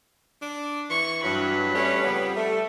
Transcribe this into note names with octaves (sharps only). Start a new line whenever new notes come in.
D4
E3 C#6
G2 F#3 B4
G3 A3 C#4
F2 C#3 B3
A3